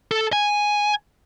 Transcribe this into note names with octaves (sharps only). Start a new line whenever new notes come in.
A4
G#5